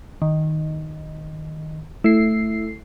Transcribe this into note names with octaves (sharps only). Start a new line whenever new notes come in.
D#3
A3 E4 C7